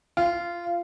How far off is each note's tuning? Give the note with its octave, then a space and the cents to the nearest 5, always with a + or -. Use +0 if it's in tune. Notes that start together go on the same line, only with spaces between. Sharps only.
F4 -15